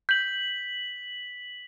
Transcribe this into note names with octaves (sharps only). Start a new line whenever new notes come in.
G6 B6 F#7